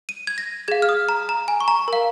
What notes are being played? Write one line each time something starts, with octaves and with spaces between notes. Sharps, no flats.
D#7
G#6
A#6
G#4 F5 G#6
F6
D#6
A#5
A#5
G#5
C#6
A#5
A#4 F5